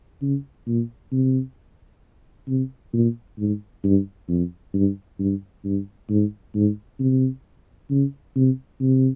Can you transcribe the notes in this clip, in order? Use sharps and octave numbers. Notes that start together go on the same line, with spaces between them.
C#3
A#2
C3
C3
A#2
G#2
G2
F2
G2
G2
G2
G#2
G#2
C3
C#3
C3
C3